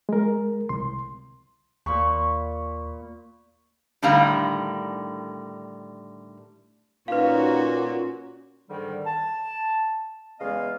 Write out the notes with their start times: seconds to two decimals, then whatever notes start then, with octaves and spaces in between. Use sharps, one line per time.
0.09 G#3 A#4
0.69 C2 C6
1.86 D#2 A#2 B5 C#6
4.02 A2 D3 D#3 G3 F5 A#5
7.08 A#2 C#4 D#4 F#4 B4 F5
8.69 G#2 D3 D#3 G3
9.06 A5
10.40 E2 C#3 G#3 B3 D#5 F5